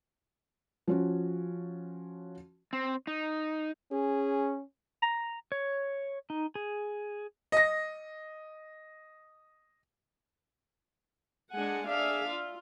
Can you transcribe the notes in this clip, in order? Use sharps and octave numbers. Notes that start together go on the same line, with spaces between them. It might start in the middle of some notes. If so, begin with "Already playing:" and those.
F3 C#4 F#4
C4
D#4
C#4 G#4
A#5
C#5
D#4
G#4
D#5 A#6
G#3 D4 F#5 G#5
D4 G#4 E5 F5
F4